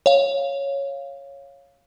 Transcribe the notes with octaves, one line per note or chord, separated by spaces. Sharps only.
C#5 F5